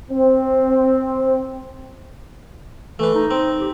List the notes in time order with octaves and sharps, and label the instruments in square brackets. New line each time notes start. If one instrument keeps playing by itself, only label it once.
[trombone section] C4
[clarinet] E3 [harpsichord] A3 B4
[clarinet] D#4
[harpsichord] C4
[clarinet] G4